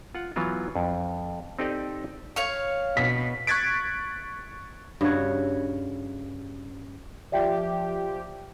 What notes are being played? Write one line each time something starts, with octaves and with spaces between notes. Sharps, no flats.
F4 F#5
E3 F#3 B3 F4 F#4
F2
C4 D#4 G4 A4 D5 D#5
C#5 F5 C#6
B2 B6
C#6 F#6 G#6 A6 B6 D7
G2 C#3 F#4 C#5
F3 G4 D5 E5 G5